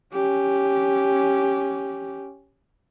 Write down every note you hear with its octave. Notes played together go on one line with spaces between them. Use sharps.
C#4 G4